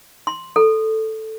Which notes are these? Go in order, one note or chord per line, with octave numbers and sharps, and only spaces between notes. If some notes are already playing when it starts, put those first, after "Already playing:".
C6
A4